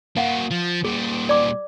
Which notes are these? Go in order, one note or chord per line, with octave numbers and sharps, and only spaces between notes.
A#3 F#4 F5 F#5
F3
A#2 G3 G#4
D5 D6